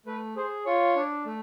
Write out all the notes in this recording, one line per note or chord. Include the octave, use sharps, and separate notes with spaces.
A3 B4
G#4 C5
F4 C#5
D4
A3